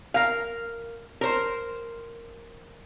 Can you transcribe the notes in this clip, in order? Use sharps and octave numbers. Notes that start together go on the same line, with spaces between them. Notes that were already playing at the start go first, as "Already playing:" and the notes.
A#4 F5
A#4 C5